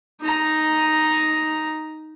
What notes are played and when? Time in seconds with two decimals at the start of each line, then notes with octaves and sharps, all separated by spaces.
0.21 D#4 A#5